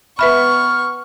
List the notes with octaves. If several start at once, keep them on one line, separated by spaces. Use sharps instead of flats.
B3 B4 E5 B5 C#6 F6